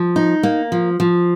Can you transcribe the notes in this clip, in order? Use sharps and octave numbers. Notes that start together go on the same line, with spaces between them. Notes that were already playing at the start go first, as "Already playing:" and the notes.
Already playing: F3
D#4
A#3
F3
F3